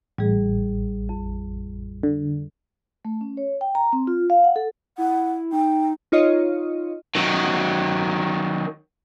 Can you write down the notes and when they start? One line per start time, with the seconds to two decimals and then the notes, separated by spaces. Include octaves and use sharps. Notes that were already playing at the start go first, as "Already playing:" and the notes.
0.18 A1 G3 G#4
1.09 F2
2.03 D3
3.05 A3
3.21 C#4
3.37 C#5
3.61 G5
3.75 A#5
3.93 C4
4.07 F4
4.30 F5
4.44 F#5
4.56 A4
4.98 E4 F#5
5.53 D#4 G5
6.12 D#4 F4 C#5 D#5
7.15 D#3 F#3